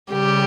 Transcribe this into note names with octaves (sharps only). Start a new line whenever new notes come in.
C#3 G3 G4